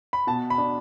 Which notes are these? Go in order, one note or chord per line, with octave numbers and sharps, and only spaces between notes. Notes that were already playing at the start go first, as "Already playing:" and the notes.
B5
B2 A5
B5
D4